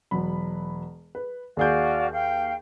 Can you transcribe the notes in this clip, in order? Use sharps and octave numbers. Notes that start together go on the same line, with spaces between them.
E1 F#3 B5
B4
D#2 F#4 G#4 D5 F5 G6
F5 G5